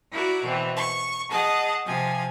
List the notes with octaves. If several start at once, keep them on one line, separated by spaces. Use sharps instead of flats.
E4 F#4 A#4 D5
B2 E3 C4
C#6
G#4 D#5 F#5 A5
C3 F3 G#5